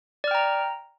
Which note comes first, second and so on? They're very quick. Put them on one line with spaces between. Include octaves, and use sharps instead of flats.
D5 F6 G5 A#5